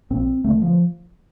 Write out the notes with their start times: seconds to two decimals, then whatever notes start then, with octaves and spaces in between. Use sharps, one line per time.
0.10 A#1 A#2 C4
0.44 D2 D3 A3
0.62 F3